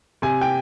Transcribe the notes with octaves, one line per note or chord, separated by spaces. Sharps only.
C3 G#5
G5